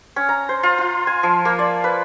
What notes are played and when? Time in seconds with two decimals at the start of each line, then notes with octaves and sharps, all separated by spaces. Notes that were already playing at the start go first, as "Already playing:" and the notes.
0.16 C#4
0.29 A#5
0.49 C5
0.63 F4
0.78 F4
1.07 G#5
1.23 F3
1.45 A#3
1.59 D5
1.84 B4